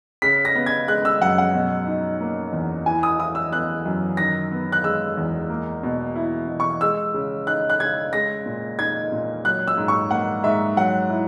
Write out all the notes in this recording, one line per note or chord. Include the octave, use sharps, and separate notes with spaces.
C#3 B6
A#6
B3
G#6
G#3 F#6
E6
F#2 F#5
F#5
B2
D#4
A#3
E2
E3 G#5
D#6
E4 D#6
E6
B3 F#6
F#2
D#3 A#6
B3
F#6
G#3 E6
E2
A#3
B2
E4
B2
C#6
G#3 E6
C#3
D#4 F#6
F#6
C#3 G#6
G#3 A#6
A#2
D#4 G#6
A#2
F#3 F#6
E6
G#2
C#6
A#3 F#5
G#2 E5
F#3 F#5
E4